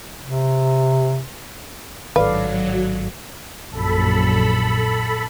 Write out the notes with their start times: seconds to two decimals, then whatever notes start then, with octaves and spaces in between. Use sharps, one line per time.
0.23 C3
2.16 A1 G#2 D#3 F#3 A4 B4 D5 F5
3.72 A#1 F#2 A#2 A4 B5